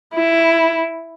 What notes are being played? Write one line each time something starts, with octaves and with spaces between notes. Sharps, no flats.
E4